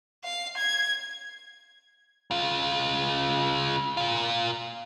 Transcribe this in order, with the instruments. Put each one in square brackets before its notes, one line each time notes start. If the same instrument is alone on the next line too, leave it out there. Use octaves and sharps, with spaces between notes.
[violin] F5
G#6
[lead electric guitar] C#3 F4
A#2 F4